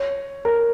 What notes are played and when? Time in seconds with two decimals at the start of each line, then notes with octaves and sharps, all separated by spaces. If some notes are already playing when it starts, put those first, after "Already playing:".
Already playing: C#5
0.45 A#4